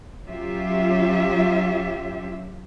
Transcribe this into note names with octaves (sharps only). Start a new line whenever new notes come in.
F#3 C#4 F4 G4 E5